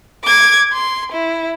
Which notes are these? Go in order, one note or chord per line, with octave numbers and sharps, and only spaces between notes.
D6 G#6
C6
E4